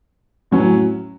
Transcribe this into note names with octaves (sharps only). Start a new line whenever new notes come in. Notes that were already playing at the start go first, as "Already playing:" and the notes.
A2 F#3 C#4